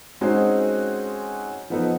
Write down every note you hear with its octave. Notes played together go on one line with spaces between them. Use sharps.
G#3 C4 C#4 D#4 F#4 G#4
F3 B3 D#4 A4